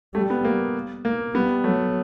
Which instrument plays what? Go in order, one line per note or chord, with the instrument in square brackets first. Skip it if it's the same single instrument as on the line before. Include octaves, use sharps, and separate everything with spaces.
[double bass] G3 [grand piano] A3
[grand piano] B3
A#3
A#3
[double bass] G3 [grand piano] B3
[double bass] F#3 [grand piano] A3